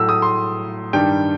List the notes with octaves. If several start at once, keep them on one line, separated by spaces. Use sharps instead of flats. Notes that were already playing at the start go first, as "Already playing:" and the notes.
Already playing: A2 F#3 A3 E6
D#6
C6
G2 D#3 G3 G5